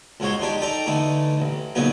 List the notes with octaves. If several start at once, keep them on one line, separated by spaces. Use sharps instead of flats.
C#2 G#2 G#3 F#4 C#5 C6
G#3 D4 D#4 G4
D#4 A4 D5 G5 A#5
D3 E3 A3 D#4
A1
C#2 A#2 C#3 F#3 B3 D#4